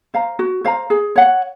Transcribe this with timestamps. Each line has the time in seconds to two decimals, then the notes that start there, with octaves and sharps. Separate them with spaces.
0.14 C5 F5 A#5
0.39 F#4
0.65 C5 F5 A#5
0.90 G#4
1.16 C#5 F#5